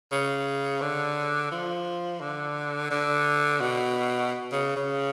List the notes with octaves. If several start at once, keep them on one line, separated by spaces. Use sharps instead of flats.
C#3
D3
F3
D3
D3
B2
C#3
C#3